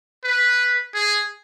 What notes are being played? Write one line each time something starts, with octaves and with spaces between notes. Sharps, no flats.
B4
G#4